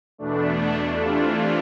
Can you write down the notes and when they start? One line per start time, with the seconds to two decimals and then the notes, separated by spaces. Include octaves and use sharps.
0.18 E2 B2 A3 D4
0.98 C3 E3 A3 D4 F4